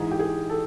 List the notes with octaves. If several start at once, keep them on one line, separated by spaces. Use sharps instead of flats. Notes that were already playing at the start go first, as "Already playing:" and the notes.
Already playing: G#2 E3 G#4
G4
G#4
A4